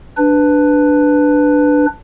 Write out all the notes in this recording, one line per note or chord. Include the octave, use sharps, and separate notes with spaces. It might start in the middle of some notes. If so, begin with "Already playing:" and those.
D4 B4